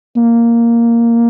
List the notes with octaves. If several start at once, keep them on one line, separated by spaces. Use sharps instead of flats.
A#3